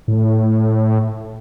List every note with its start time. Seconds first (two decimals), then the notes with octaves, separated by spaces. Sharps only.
0.08 A2